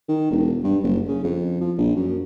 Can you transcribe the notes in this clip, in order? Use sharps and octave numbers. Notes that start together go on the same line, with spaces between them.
D#3
E1
G2
F#1
C#3
F2
F3
A#1
F#2